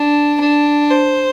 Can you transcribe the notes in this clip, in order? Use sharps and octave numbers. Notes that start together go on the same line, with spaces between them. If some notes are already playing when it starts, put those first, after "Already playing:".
Already playing: D4
D4
C5